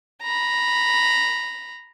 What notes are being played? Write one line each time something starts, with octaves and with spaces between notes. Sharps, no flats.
A#5 B5